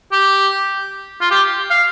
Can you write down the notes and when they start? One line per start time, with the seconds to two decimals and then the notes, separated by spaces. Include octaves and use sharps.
0.12 G4
1.21 F4
1.31 G4
1.70 F5